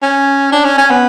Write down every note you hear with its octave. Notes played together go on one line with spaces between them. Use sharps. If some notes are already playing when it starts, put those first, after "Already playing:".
C#4
D4
C#4
C#4
B3